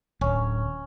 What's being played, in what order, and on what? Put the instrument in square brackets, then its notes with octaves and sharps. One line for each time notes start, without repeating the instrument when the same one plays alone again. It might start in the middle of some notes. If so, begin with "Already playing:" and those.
[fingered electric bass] D1 [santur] C#4